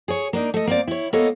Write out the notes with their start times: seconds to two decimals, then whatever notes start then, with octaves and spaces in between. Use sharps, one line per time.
0.08 G#4 C#5
0.33 A#3 D4 D#4
0.54 A3 D#5
0.67 A#3 C4 D5
0.87 E4 C#5
1.13 A#3 B3 A4 C#5 D#5